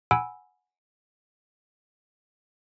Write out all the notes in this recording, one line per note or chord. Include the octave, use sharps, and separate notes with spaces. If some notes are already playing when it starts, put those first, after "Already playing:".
F#5 G#5 B5 E6 D7